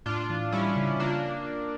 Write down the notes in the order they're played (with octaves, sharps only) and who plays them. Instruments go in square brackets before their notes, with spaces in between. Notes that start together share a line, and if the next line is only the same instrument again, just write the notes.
[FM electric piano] A2 [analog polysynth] D4 F4
[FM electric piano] E3
[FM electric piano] G3 [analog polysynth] C#4 E4
[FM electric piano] C#3
[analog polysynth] A#3 D4 [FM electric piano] F4